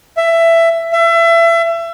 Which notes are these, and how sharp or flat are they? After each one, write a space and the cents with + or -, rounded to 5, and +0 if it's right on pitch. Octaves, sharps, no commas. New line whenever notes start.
E5 +15
E5 +30